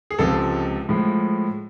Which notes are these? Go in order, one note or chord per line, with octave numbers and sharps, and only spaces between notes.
G#4
C#2 C3 F3 G#3 A4
A2 F3 G#3